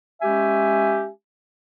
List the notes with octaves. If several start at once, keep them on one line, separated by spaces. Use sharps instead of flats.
G#3 C#4 G4 E5 G#5